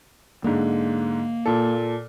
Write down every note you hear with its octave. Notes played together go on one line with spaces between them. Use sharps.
G#2 D3 A#3
A#2 A4